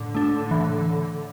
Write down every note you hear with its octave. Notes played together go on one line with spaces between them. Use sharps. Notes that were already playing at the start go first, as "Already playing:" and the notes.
Already playing: A2 D3
A3 D4
E3